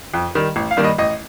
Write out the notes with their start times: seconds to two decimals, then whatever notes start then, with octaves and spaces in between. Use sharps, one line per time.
0.14 F2
0.35 D#3 G3
0.56 A1
0.71 F5
0.77 G2 D#3 G3 A#3
0.84 D#5
0.98 A1 D#5